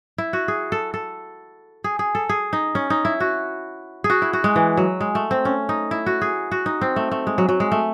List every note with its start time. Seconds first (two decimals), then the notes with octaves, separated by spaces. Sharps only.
0.18 E4
0.33 F#4
0.48 G#4
0.72 A4
0.94 A4
1.84 G#4
1.99 G#4
2.15 A4
2.29 G#4
2.53 D#4
2.75 C#4
2.90 D#4
3.05 E4
3.20 F#4
4.04 G#4
4.10 F#4
4.22 E4
4.33 F#4
4.44 G#3
4.56 E3
4.77 F#3
5.01 G#3
5.15 A3
5.31 C4
5.45 C#4
5.69 D#4
5.91 E4
6.06 F#4
6.21 G#4
6.51 F#4
6.66 D#4
6.81 C4
6.96 A3
7.11 A3
7.27 G#3
7.38 F#3
7.49 F#3
7.60 G#3
7.72 A3